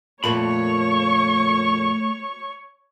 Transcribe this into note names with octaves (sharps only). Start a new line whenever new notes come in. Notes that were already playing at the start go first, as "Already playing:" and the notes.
F2 A#2 A3 A#3 C#5 B5 C#6